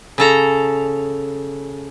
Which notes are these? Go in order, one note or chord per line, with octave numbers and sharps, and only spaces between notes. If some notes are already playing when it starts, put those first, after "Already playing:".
C#3 A4 A#5